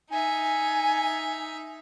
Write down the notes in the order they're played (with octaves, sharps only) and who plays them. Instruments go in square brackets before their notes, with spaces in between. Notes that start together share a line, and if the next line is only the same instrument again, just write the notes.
[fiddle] D#4 E5 [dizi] G#5